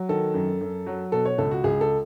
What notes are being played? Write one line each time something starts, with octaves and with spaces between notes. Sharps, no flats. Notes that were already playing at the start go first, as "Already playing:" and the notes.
Already playing: F#3
D#3 A4
F#2
F#2
F#3
B2 A4
C#5
C#2 A4
F#4
C#2 G#4
A4